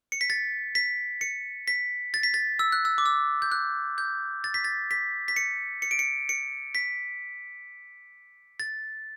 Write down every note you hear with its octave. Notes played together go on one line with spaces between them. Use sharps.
C#7
B6
A6
B6
C#7
B6
A6
B6
A6
E6
F#6
E6
D6
E6
G6
F#6
G6
A6
B6
A6
B6
B6
C#7
C#7
D7
C#7
C#7
B6
A6